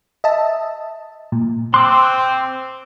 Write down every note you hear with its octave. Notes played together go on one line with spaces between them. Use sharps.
D#5 E5 A5
A#2
C4 C6 D6 E6 F#6